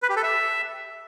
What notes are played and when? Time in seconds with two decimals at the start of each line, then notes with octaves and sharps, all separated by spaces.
0.03 B4
0.10 G4
0.16 A4
0.23 E5